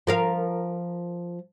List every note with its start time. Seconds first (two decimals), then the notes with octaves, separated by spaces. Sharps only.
0.07 F3 A#4 F5